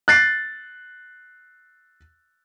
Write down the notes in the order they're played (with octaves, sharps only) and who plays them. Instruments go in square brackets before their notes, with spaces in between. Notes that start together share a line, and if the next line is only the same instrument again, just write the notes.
[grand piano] F#6 A6 C7